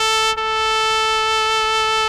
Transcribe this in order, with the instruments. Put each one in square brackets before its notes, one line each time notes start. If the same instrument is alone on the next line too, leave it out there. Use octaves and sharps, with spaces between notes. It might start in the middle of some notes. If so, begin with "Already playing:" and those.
Already playing: [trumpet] A4
A4